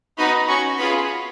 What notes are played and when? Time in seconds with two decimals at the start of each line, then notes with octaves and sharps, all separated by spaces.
0.17 B3 D#4 F#4 B5
0.48 C#4 F#4 C#6
0.79 B3 F4 G#4 B5